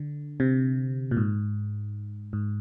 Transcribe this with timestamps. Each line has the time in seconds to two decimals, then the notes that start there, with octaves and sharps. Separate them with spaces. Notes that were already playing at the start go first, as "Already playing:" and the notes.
Already playing: D3
0.40 C3
1.11 A#2
1.17 G#2
2.33 G#2